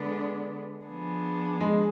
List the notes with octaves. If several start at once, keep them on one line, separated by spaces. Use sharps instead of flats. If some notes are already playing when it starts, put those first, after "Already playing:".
Already playing: D3 G#3 B3 D4
F3 B3 D4 G#4
G#3